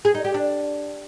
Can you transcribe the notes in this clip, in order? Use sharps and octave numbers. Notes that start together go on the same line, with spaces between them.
G#4
D#4
G4
D4